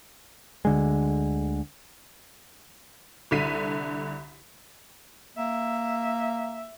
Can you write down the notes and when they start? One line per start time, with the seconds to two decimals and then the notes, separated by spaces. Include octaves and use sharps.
0.65 D2 D3 G#3
3.31 C2 D3 B6 D#7
5.37 A#3 E5